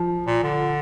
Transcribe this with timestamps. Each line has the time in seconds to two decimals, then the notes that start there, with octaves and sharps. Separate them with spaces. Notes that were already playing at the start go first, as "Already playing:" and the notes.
Already playing: F3
0.27 A#2
0.43 D3